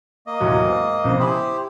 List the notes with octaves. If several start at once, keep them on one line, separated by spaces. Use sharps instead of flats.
A#3 D#5
A1 D#2 F#3
G#2
A#1 C#3 C5
E4 G4 C5 G#5 B5 D#6